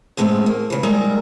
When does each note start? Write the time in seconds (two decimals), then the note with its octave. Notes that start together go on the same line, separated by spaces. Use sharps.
0.17 E2 A2 G#3 C4 C#4
0.46 A#3
0.70 C#3 E3
0.83 G3 G#3 A#3 D#4 A#4 E5